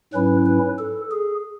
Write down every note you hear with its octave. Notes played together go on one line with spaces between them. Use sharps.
G#2 F#3 C#4 E4 B4
B4
A4
G#4